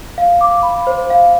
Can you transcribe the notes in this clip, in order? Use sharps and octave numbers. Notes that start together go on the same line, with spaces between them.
F5
D6
B5
C5
F5